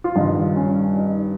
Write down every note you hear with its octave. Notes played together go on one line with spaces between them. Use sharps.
F4
G2 D#3 D#4
C#4
D#4